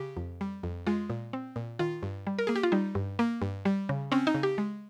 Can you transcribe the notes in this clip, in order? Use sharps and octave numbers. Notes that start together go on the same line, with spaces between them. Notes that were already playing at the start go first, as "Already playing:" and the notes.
Already playing: C#3 G4
F2
G3
F2
G#3 F4
A#2
C4
A#2
D#3 F4
G2
G3
A#4
A#3 G#4
G4
F4
G3 D#4
G2
A#3
G2
G3
C#3
C4 C#4
D#4
C#3
G4
G#3